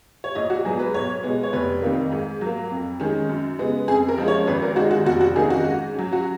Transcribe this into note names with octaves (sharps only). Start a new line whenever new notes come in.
C#5
A#1 D#5
F#4
G#2 F#3 B3 G#4
B4
B1 C#5
B2 G#3 B3
C#5
F1 B4
F2 D#3 A#3
G#2
F#3 A#3
F2
D#3 G#3 C#4
F#2
C#3 G#3 B3
F2 G#4
A#4
F3 G#3 C#4
C#5
G#1 B4
A#4
F#2 D#3 G#3 F#4
F#4
F1 F#4
F#4
F2 D#3 A#3 C#4 G#4
F#4
G#2
F#3 C#4
F#4